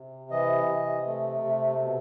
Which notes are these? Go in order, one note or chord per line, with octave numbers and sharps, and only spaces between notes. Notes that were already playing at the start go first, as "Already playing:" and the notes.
Already playing: C3
E3 D#5
C3
A3
C3
B2